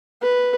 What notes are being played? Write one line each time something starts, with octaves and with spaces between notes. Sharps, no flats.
B4